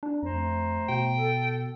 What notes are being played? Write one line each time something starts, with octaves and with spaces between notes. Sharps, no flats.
D4
F2 A3 C5 A#5
B2 G5
A4